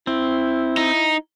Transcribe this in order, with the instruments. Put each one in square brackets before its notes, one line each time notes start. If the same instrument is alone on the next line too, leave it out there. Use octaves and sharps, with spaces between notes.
[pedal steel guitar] C4 [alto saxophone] E4
[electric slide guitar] D#4